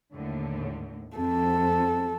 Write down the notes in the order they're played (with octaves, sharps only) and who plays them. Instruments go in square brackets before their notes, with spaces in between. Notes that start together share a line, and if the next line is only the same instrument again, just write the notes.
[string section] D#2 A2 D3
[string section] F2 [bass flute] C4 [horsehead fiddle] A4